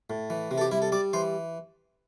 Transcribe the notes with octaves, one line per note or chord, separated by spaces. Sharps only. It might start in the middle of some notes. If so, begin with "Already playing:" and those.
A2
E3
C3
A4
G4
G3 E4
A4
G3 D5
E3 C5